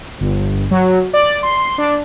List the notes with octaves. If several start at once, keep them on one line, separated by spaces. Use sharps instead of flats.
G1
F#3
D5
C6
D4